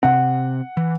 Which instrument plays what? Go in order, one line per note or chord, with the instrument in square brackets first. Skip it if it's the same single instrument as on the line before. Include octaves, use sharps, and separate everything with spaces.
[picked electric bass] C3 C4 [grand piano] F#5
[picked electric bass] E3